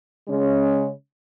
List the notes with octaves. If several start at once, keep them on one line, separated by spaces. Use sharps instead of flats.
C#3 G#3 C#4